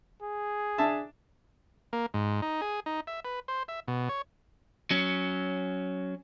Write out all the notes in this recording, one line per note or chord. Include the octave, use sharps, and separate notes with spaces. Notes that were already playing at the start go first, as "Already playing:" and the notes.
G#4
D4 E5 A5
A#3
G#2
D#4
G#4
D#4
E5
B4
C5
E5
B2
C#5
F#3 C#4